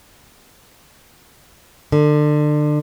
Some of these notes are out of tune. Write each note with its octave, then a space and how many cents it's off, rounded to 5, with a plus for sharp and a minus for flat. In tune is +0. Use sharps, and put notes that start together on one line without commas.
D3 +30